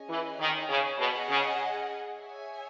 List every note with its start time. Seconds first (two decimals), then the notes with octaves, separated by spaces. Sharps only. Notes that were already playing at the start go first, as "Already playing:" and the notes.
Already playing: C#4 G#4 D#5 G#5
0.09 E3
0.40 D#3
0.69 C#3
0.99 B2 G#4 D#5 F#5
1.30 C#3
2.18 G#4 C#5 E5 G#5